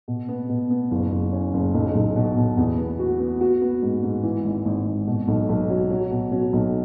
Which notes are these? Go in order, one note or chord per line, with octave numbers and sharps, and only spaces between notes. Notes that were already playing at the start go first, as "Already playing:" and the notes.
B2
B3
B2
B3
F#1
F#1
C#4
F#1
B1
B1
B2
B2
E2
B3
F#4
B3
F#4
B3
G#2
G#2
E3
G#1
G#1
G#1
B2
B1
B1
F#3
F#3
B2
F#3
B1